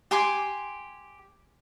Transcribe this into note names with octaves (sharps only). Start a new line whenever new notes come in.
G4 G#5 C6 D6